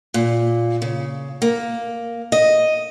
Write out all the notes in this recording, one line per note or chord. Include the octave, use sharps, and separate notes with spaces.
A#2
C#3
A#3
D#5